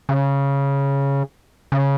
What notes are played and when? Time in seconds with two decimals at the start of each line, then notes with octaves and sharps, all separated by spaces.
0.09 C#3
1.72 C#3